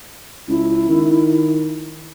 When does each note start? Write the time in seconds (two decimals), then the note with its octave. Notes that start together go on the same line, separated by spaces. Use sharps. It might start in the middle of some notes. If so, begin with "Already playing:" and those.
0.48 C#2 E4
0.89 D#3